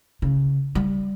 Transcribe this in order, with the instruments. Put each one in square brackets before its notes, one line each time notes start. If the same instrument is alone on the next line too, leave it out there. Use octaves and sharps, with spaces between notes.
[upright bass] C#3
G3